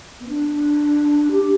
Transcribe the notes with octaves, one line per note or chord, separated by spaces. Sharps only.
B3
D4
G4